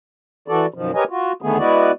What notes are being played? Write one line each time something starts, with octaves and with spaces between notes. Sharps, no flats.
E3 F#4 A4 D5
F#2 B2 D#3 F3
G4 A#4 B4 C#5 D#5 G#5
F4 F#4
D2 D3 D#3 A3 B3 G#4
G#3 B3 E4 F#4 B4 D5